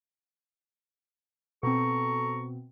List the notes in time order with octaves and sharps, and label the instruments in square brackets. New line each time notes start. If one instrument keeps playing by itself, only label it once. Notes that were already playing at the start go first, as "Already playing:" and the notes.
[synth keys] B2 C4 [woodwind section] A4 A#5 C#6